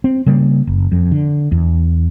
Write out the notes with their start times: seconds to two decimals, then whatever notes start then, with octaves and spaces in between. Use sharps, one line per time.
0.04 C4
0.26 C#3 G3 A3 A#3
0.67 F#1
0.92 F2
1.12 D3
1.52 E2